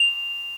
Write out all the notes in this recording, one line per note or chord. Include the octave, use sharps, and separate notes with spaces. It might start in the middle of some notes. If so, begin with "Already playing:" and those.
Already playing: F7